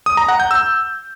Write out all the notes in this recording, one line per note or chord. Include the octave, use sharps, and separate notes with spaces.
D#6
A#5
F#5
G6
E6